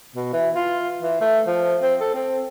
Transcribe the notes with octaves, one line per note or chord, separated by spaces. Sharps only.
B2
E3
F4
E3
A3
F3
C4
A4
C4